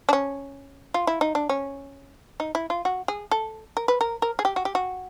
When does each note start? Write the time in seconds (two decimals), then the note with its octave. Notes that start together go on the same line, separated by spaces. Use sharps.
0.09 D4
0.13 C#4
0.94 F4
1.07 E4
1.21 D#4
1.35 D4
1.49 C#4
2.40 D#4
2.55 E4
2.70 F4
2.85 F#4
3.08 G#4
3.31 A4
3.77 A#4
3.88 B4
4.01 A#4
4.22 A#4
4.39 G#4
4.45 G4
4.56 F#4
4.65 G4
4.75 F#4